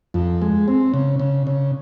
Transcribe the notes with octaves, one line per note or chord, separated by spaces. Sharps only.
F2
G#3
C4
C#3
C#3
C#3